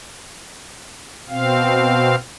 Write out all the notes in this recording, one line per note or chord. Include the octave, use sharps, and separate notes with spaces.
B2 C4 F5